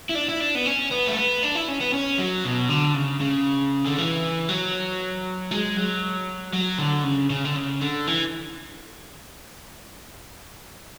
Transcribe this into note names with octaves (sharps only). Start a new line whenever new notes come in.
E4
D4
E4
D4
B3
C#4
B3
A3
B3
D4
E4
C#4
B3
C#4
F#3
B2
D3
C#3
C#3
D3
E3
F#3
G#3
F#3
F#3
D3
C#3
C#3
D3
C#3
D3
E3